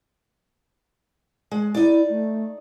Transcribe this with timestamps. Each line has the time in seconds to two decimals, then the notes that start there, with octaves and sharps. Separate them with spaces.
1.51 G#3
1.75 D#4 E4 D5
2.10 A3